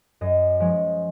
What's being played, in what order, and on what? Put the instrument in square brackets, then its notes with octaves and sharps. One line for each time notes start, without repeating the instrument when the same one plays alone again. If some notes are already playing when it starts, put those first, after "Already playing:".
[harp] F#2 D#5
F3 G#3 C#4